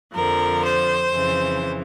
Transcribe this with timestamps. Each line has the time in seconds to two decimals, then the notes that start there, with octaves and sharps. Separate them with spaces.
0.14 F2 D3 F3 A#4
0.64 C5
1.13 F2 C#3 E3